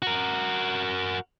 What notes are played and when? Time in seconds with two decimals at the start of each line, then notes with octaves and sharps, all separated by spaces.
0.02 F#4 A#4